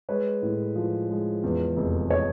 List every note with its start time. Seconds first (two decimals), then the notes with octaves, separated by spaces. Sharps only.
0.09 G#3 B4 C#5
0.42 A2
0.75 F3
1.10 G#3
1.44 E2
1.77 F1
2.10 C#5 D#5